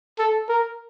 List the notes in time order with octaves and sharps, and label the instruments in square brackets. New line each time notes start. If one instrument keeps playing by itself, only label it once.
[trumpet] A4
A#4